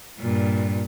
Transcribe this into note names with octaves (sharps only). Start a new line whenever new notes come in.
G2 A#2